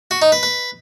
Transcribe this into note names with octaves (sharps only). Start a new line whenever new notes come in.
F#4
D#4
B4
B4